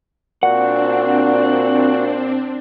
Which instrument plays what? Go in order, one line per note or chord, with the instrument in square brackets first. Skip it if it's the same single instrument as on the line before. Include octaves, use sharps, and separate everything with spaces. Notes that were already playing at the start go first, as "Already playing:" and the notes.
[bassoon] A#2 [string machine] C4 D4 [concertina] F#4 [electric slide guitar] F#5